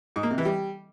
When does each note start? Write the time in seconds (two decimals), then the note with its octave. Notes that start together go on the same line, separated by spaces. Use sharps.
0.16 G#2
0.23 A#3
0.31 C3
0.38 E3
0.45 G3